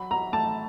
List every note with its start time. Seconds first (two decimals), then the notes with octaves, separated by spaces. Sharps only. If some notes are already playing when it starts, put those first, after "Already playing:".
Already playing: F#3 B5
0.11 F#3 A#5
0.32 A3 A5